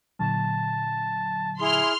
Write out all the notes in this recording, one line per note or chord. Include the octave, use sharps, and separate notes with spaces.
A#2 D3 F#3 A5
E4 G#4 C6 F6